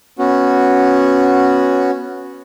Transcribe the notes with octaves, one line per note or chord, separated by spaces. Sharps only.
B3 C#4 F#4